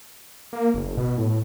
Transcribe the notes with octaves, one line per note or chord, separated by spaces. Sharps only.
A#3
F#1
B2
A2